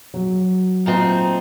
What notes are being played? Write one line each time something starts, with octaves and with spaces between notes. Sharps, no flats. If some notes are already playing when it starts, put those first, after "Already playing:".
F#3
A#2 A3 C4 D#4